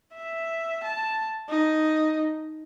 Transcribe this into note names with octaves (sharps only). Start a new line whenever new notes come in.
E5
A5
D#4